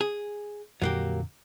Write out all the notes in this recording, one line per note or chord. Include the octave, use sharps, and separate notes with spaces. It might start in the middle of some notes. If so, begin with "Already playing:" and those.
G#4
F2 A#2 D3 F#3 A#3 G4